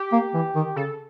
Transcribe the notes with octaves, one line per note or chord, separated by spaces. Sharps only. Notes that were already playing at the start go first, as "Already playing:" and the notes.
Already playing: G4
A#3
E3
D#3
C#3 A4